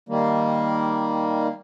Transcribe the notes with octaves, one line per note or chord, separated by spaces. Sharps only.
D#3 G3 A#3